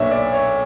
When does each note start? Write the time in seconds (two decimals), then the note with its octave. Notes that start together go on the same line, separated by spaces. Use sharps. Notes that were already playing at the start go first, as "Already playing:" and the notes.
Already playing: B1 A#2 F#3 B3 D4 C#5 E5
0.11 D5
0.33 C#5